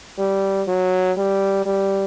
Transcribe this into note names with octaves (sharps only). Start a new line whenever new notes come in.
G3
F#3
G3
G3